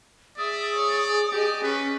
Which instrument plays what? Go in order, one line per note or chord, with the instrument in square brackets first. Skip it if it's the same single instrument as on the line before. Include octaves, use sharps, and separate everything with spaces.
[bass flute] G#4 [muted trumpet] D5 [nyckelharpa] E5 [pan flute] D#6
[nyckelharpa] C#5
[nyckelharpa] G4 D#5 [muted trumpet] D5
[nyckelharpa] C#4 [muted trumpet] B4